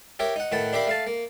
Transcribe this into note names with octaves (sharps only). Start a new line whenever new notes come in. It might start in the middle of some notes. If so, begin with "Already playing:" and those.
G4 A#4 C#5 E5
D#4 F#5
A2 D#3 B4 F#5 A5
D4 G4 A#4 E5 F5 B5
A3 F5 A5
A#3